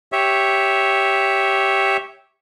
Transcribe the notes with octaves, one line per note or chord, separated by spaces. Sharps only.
G4 C#5 E5